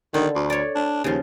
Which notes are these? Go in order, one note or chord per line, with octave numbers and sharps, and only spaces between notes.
D3 D#3
D2
C#5 D5
D4
D#2 C#3 F3